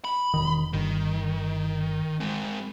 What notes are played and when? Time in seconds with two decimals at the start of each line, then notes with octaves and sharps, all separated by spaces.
0.05 B5
0.34 E1 B1 D#3
0.73 G1 D#3
2.20 G#3 C4